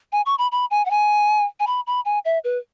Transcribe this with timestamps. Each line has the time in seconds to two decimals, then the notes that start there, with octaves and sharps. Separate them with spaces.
0.12 G#5
0.26 C#6
0.39 B5
0.52 B5
0.71 G#5
0.86 F#5
0.91 G#5
1.60 G#5
1.67 B5
1.87 B5
2.05 G#5
2.25 E5
2.44 B4